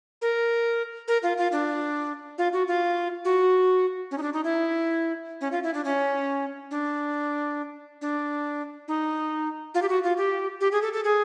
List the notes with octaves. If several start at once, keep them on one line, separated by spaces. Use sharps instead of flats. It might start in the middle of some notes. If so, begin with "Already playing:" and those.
A#4
A#4
F4
F4
D4
F4
F#4
F4
F#4
C#4
D#4
D4
D#4
E4
C#4
F4
E4
D4
C#4
D4
D4
D#4
F4
G4
F#4
F4
G4
G4
G#4
A4
A4
G#4